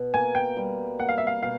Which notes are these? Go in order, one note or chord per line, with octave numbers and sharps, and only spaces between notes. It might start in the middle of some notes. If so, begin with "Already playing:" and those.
Already playing: B2
A#3 G#5
G5
G3
A#3 F#5
F5
E5
F5
B2 F5